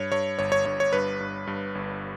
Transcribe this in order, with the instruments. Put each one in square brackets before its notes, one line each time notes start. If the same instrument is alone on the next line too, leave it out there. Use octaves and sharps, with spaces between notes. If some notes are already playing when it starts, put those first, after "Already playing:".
Already playing: [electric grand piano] G2 C#5
G2 C#5
G1 C#5
C#5
G2 C#5
C#5
G2 B4
G2
G2
G1